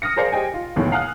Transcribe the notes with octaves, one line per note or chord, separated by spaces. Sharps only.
D#6 F6 A#6 C#7
G#4 A#4 C5 D5 F5
G4 C5 D#5 G5 G#5
F4
G1 D#2 B2 E3 A3 C#5
F5 F#5 G#5 D#6 F6 F#6